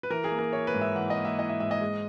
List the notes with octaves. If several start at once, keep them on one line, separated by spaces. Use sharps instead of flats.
B4
E3 A#4
G#4
A#3
A#4
E4 C#5
B4
G#2
E5
E3 F#5
D#5
A#3
E5
E4 D#5
E5
G#2 E5
D#5
G#3